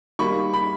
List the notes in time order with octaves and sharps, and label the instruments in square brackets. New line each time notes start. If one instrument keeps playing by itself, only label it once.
[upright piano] D#3 G3 A#3 B5 C#6
B5